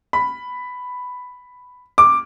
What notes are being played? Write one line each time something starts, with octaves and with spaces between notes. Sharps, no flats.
B5
D6